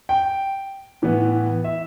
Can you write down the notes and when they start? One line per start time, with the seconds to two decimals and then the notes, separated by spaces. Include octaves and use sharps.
0.09 G5
1.02 A2 E3 B3
1.64 E5